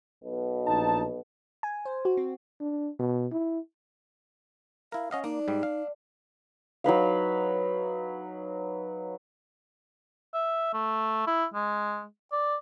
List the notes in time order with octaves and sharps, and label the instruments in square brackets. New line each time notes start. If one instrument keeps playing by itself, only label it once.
[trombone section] B1 B2
[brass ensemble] A#1 D#4 A5
[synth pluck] G#5
C5
F#4
C4
[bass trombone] D4
B2
E4
[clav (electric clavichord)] E4 A#4 [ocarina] F5
[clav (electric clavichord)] C#4 D#5 F5 [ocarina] F#5
[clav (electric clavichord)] A#3 [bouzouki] D4 [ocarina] D#4
[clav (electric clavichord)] G#2 G3
F5
[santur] F#3 D#4 B4 F5
[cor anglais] E5
A3
E4
G#3
D5